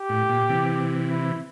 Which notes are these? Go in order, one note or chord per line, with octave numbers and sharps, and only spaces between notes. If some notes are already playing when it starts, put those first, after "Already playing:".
Already playing: G4
A2
A#2
C3 E3
E4